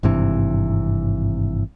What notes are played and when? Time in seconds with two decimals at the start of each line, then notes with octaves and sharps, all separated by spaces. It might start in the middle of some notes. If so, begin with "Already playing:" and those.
0.03 G#1 G2 C3 E3